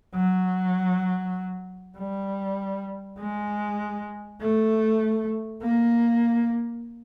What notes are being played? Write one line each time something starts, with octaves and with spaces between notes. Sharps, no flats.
F#3
G3
G#3
A3
A#3